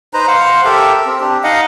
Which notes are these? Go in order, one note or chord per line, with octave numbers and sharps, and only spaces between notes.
D#4 B4 C5 A#5
C5 F5 F#5
G4 A4 A#4 E5
C4
D4 G4
D#4 D#5 F5 F#5